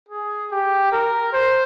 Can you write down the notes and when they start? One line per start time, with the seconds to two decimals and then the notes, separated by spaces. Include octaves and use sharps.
0.09 G#4
0.51 G4
0.92 A#4
1.33 C5